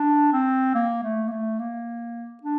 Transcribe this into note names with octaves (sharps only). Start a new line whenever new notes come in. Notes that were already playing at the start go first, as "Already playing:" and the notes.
Already playing: D4
C4
A#3
A3
A#3
A3
A#3
D4